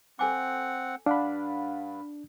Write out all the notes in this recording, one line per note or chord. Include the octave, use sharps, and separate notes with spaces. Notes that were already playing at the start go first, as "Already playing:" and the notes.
C4 A4 F#5 G#5 D6
G2 D4 F5 F#5 B5